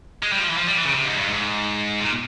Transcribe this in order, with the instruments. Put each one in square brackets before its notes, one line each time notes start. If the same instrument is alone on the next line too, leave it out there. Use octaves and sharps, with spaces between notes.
[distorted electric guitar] G#3
G3
F3
E3
F3
G3
E3
C#3
C3
G#2
G2
G#2
A#2